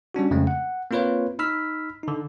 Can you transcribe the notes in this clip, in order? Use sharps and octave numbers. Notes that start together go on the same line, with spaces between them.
G3 C#4 D4 F#4
F2 C#3 G#3 A3 C4 C#4
F#5
A#3 C4 F4 B4 C#5 F5
D#4 B5 E6 F6 B6
D3 D#4